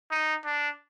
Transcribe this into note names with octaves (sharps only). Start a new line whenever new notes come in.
D#4
D4